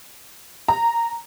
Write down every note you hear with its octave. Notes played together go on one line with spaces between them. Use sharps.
A#5